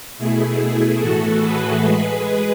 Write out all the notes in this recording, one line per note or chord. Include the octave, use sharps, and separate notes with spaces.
B2 A3 E4 G#4
E4 G#4
A2 E3 A3 F#4 A4
G#4 B4
G#3 G#4 B4